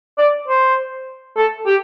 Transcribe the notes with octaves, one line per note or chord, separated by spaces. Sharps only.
D5
C5
A4
G4